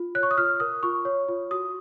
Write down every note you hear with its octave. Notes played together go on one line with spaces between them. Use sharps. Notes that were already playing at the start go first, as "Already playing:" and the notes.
Already playing: F4
C#5 F#6
C#6
D#6
F4 F6
A#4 D#6
F4 C#6
C#5
F4
F#4 D#6